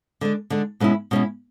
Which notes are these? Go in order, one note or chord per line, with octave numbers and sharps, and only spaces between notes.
D3 G#3 D4
D3 G#3 D4
B2 G#3 C#4 E4
B2 G#3 C#4 E4